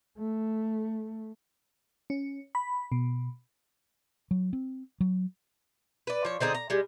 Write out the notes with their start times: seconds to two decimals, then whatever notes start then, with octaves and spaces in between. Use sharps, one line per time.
0.18 A3
2.10 C#4
2.55 B5
2.92 B2
4.31 F#3
4.53 C4
5.00 F#3
6.07 B4 D5
6.25 F3 C#5
6.40 D3 C4 D#4 G#4
6.55 A#5
6.70 G3 G#3